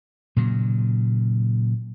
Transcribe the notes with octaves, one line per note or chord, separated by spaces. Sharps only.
A#2 C#3 F#3